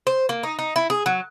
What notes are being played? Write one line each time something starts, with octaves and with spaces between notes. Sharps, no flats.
C5
A#3
D#4
D#4
E4
G#4
F#3